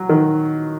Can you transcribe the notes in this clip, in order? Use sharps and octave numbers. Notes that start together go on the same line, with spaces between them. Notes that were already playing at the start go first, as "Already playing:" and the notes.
Already playing: F#3 F#4
D#3